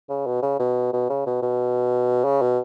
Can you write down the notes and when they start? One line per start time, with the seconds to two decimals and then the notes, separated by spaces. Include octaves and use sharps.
0.09 C#3
0.26 B2
0.43 C#3
0.59 B2
0.93 B2
1.10 C#3
1.26 B2
1.42 B2
2.25 C#3
2.42 B2